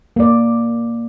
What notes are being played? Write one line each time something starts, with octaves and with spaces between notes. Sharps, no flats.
A#3 D5